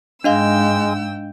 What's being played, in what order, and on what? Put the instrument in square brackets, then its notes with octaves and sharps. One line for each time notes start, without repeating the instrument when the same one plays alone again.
[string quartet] G#2 G5 E6 [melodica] G#3 [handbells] D4 D#5 F5